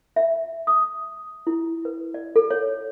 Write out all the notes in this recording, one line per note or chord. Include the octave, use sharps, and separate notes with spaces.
E5
D#6
E4
B4
D5
A4
C#5